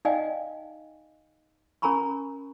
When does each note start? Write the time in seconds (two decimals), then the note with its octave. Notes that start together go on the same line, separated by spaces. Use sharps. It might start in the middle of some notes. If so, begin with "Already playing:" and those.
0.05 D#4 D5 D#5 F5 G5 G#5
1.82 C#4 A#4 G#5 A#5 B5 C#6